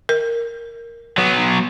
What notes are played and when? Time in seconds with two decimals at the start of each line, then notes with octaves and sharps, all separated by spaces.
0.09 A#4
1.18 F#3 B3